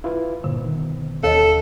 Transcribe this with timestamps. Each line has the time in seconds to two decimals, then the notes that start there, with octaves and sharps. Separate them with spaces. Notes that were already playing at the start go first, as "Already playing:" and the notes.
0.04 E4 F4 B4
0.44 G2 A#2 D3
0.61 B2 D#3
1.23 D#2 A4 C#5 D#5